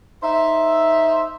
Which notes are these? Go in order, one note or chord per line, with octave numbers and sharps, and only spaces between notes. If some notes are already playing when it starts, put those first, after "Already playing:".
D#4 C5 E5